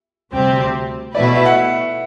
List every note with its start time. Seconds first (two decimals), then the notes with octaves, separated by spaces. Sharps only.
0.32 D2 C3 G3 C4 G4
1.14 B2 A3 E4 B4 D5
1.36 E5
1.45 F#5